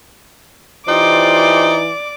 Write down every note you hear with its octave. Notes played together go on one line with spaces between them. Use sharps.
E3 D#4 F4 G4 C5 D5 D6